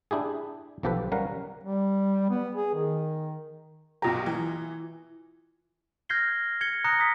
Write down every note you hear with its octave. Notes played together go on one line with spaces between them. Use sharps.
D4 E4 G4 G#4
B1 F3 G4 A4 B4
G3 C#4 A#4 F5 F#5
G3
B3
G#4
D#3
A#1 B2 F4 G4 A#5
E3
F6 G6 G#6 A#6 C7 G7
G#6 C#7 G7
A#5 D#6 F#6 A#6 C#7
D#6 B6